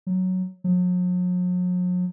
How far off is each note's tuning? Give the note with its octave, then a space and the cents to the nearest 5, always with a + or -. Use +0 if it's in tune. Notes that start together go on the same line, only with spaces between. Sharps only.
F#3 +0
F#3 -45